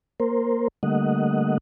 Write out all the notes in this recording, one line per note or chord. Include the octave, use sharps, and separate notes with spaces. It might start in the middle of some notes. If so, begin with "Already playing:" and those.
A#3 A#4 C5
D3 G3 A3 A#3 D#5 F#5